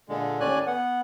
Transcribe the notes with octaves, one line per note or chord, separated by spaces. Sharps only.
A#2 D3 G#3
D#2 A2 C#4 D5 G#5 F#6
B3 F#5